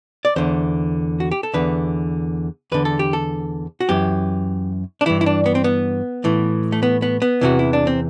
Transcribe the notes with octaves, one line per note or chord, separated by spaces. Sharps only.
D5
E2 D3 C5
F#4
G4
A4
E2 D3 B4
E2 D3 B4
A4
G4
A4
F#4
F#2 E3 G4
D4
G2 E3 E4
E4
D4
B3
C4
B3
A2 E3
A3
B3
B3
B3
E2 C3 E3 F#4
E4
D4
C4